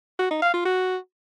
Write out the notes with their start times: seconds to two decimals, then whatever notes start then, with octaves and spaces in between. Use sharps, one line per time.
0.19 F#4
0.30 D#4
0.42 F5
0.54 F4
0.65 F#4